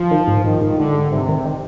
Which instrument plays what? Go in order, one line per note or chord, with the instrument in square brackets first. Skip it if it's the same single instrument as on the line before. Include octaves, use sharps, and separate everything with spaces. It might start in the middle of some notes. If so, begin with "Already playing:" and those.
Already playing: [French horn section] F3
[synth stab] D#3
G#2
[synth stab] G#2 [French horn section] D#3
[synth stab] G#2
[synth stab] G#2 [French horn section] D3
[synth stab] G#2
[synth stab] G#2 [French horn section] C3
[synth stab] D#3
D#3